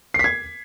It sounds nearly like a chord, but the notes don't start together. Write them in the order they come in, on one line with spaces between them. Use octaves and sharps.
C7 B6 G#6